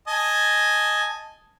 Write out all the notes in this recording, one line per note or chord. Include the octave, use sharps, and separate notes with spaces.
D#5 G#5 A5